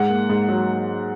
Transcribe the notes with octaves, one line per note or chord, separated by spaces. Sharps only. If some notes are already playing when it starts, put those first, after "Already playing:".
Already playing: G#2 G#3 F#5
A#3
G#2
F#3